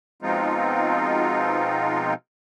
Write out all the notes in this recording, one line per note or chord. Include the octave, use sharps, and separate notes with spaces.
B2 F3 G#3 C4 D#4 F4